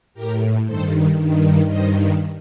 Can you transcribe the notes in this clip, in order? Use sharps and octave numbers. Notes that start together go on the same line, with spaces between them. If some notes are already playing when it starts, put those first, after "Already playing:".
A2 G4 A#4
G2 D#3 A4 C5
G2 D#3
G2 D#3 C5 D#5